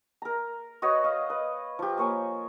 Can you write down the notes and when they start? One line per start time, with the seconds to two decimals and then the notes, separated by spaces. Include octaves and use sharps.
0.22 A#4 A#5
0.82 F#4 B4 C#5 D#5
1.04 D#5 F5
1.30 B4
1.79 F3 G4
1.98 A#3 C#5 G#5